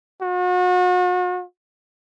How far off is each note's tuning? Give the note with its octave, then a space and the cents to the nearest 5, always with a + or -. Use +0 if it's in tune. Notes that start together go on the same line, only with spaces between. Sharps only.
F#4 -40